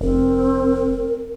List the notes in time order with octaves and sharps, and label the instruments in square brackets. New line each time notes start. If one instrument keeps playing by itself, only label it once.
[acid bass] F1 [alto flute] C4 [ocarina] A#4